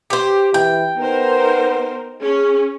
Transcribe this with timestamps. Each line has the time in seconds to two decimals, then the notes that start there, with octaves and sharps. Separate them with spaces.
0.10 G4 C5
0.54 E3 G5
0.98 B3 D#4 A#4 C5
2.22 C#4 G#4